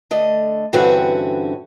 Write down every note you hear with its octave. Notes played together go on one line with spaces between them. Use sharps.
D3 A3 D#5
G2 D3 E3 C4 C#4 F#4